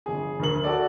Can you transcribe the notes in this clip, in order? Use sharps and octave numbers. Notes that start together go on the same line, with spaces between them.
G1 G#4
D2 A#4 F#7
F#4 A4 D5